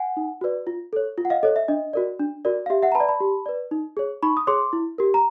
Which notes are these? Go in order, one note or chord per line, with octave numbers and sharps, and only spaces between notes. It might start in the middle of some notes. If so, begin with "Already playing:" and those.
Already playing: F#5 G#5
D#4
F#4 B4 D5
F4
A4 C#5
F4
F#5
D#5 F5
A4 C#5 D#5
E5
D4 D#5
F#4 A#4 D5
D4
F#4 A#4 D5
F5
G4 E5
E5 F#5
A#5
B4 A5 B5
D5
A5 B5
G4
B4 D5
D#4
G#4 C#5
D#4 B5 C#6
D#6
G#4 C#5 C6 D6
E4
G4 A#4
A#5